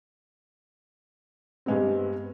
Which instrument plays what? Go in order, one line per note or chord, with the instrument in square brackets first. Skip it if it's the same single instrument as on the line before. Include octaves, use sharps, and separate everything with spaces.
[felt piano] G2 G3 G#3 B3 C4